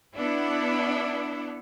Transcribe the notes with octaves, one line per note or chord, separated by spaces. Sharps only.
B3 D4 E4